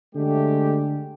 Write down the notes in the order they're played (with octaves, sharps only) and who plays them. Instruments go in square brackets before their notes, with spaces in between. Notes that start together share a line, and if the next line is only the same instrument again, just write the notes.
[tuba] D3 [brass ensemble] G#3 A3 G4